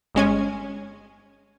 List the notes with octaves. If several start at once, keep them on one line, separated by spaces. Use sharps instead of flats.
G1 G#3 C#4 G#5